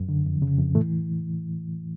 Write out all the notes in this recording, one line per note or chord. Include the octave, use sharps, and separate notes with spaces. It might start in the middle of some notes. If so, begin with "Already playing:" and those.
Already playing: F#2
D3
F2
C#3
F2
A2 E3 A3